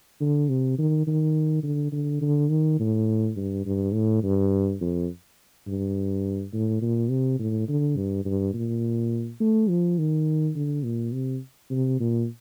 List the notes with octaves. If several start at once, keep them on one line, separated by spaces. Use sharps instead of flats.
D3
C3
D#3
D#3
D3
D3
D3
D#3
A2
G2
G2
A2
G2
F2
G2
A2
A#2
C3
A2
D3
G2
G2
A#2
A3
F3
D#3
D3
A#2
C3
C3
A#2